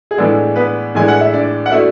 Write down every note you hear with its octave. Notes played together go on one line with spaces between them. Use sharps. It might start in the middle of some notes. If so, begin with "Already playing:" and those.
G#4
A2 E3 G#3 B3 D4 A4
B3 B4
A2 E3 G#3 B3 D4 G#5
F#5
E5
D4 D5
F#5
B2 A3 D4 E4 E5